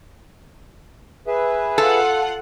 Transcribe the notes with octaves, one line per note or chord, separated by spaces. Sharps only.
G#4 B4 E5
F4 A4 F#5